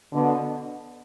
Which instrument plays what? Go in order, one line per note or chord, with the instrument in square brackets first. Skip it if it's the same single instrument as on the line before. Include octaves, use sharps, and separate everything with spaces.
[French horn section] B2 D3